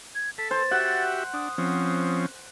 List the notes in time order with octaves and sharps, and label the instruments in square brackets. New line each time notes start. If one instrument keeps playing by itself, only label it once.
[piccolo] G#6
[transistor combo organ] A4 [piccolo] B6
[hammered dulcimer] C5 [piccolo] A6
[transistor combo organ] F#4 G4 E5 [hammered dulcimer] F#5
[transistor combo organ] D4 [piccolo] D#6
[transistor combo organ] F3 C4 C#4